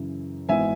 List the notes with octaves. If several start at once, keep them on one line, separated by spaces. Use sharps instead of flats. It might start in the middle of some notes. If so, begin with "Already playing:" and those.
Already playing: F#2 C#3 E3
G#1 G#2 E3 B3 E5 G#5